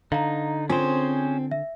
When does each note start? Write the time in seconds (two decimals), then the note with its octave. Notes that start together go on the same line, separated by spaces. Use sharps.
0.12 D3 D#4 F5 A#5
0.70 C4 C#4 F4 G#4 C5 G#5
1.51 E5